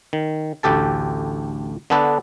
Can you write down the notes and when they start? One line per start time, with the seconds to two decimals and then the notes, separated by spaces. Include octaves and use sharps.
0.13 D#3
0.63 A1 D2 G4 A4 A5
1.90 D3 B3 D4 A4 B4